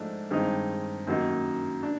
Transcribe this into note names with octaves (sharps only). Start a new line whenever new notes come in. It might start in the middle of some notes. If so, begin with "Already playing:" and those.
Already playing: G#2 F3 A3 D4
G2 D#3 G#3 C4 D#4
F#2 D#3 F#3 A#3 D#4
D4